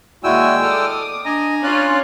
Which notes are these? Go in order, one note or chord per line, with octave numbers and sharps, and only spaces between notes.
D#2 G#3 E4 F#4 D5 G5 G#5 E6
A4 D6 D#6 F6
D4 D#5 G#5 A#5
C#4 F4 C#5 D5 F#6